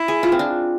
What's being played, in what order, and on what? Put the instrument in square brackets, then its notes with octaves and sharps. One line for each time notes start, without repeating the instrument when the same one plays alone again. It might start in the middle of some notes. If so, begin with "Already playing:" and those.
Already playing: [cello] E4
[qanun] G#4
F4
C4
D4